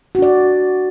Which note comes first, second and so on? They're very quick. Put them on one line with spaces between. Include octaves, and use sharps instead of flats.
F#4 D4 D5